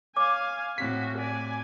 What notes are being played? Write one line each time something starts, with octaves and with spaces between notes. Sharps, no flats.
C#5 F5 G#5 D6
A2 C4 F#4 B6
D5 G#5